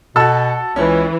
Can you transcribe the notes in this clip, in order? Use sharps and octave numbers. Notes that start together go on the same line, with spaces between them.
B2 F#4 A4 A5 E6
C#2 E3 C#4